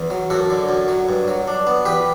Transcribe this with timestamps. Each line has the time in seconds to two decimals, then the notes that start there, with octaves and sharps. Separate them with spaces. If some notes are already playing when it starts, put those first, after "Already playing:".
Already playing: E2
0.10 F#3
0.30 F#2 F#4 A4
0.50 D3
0.69 F#2
0.88 F#3
1.09 G2
1.28 F#3
1.48 D4
1.67 B3
1.85 E2 G4 B4